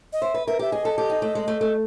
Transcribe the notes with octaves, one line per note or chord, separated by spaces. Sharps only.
D#5
C5 E5
B4
A#4 E5
G4 E5
G#4 D#5
A4
G4
D#4
A3
G#3
A3
A3